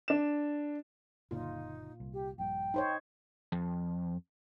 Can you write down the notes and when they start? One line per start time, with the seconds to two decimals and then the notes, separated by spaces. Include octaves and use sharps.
0.08 D4 E7
1.31 F#1 A#2 D3 D#4 F4
2.00 C2
2.13 G4
2.38 A#1 G2 G5
2.74 D#4 C5 C#5
3.52 F2